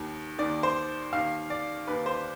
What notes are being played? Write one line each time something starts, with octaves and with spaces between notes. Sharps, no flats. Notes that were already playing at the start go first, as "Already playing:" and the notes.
Already playing: D#2 D#3
D#2 D#3 D5
C5
D#2 D#3 F5
D5
D#2 D#3 B4
C5